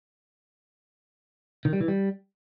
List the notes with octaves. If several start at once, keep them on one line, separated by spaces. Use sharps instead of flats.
D#3
G3
E3
G3